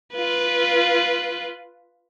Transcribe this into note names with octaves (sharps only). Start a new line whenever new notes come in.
F4 B4